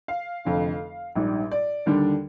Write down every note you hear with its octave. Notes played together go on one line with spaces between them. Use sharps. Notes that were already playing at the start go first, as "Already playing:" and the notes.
F5
F1 F2 D3
A#1 G#2 G3
D5
D#2 D3 G3 D4